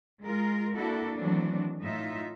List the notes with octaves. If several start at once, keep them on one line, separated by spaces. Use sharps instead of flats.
G#3 F4 A#4
A#3 D4 E4 F#4 A4
D#3 E3 F#3 A3 C4 D4
A2 D#4 F4 E5